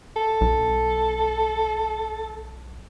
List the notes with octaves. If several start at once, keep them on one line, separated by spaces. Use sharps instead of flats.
A4
B1